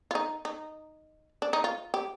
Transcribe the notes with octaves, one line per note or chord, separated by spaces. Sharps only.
F4
D#4
D#4
D4
D#4
F4
G4